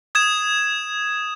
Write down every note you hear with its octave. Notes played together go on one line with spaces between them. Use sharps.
D#6 G#6 E7